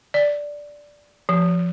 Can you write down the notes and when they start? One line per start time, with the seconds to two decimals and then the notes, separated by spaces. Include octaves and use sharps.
0.14 D5
1.29 F3